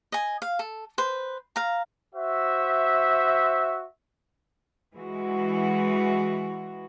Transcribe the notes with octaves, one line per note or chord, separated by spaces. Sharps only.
D#5 G#5
F5
A4
B4 C5
F5 A#5
F#4 C5 E5
E3 G#3 F#4